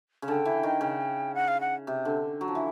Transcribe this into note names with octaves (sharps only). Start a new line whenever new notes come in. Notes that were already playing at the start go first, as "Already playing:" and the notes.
C#3
D3 G5 A5
E3
D#3
C#3
F#5
F5
F#5
C3
D3
F#3
F3
E3